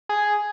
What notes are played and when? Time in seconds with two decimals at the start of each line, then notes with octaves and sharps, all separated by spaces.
0.09 G#4